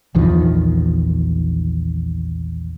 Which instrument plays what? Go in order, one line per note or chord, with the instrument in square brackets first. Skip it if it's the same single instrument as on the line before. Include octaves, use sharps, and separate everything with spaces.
[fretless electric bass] A#1 E2 D#3 F3